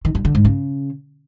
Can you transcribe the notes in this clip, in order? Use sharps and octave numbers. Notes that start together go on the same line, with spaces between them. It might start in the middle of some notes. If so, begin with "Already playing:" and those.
D#3
G2
D3
G#2
C#3